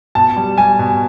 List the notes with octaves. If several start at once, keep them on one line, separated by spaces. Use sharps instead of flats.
B2 A5
G3
G3 G#5
B2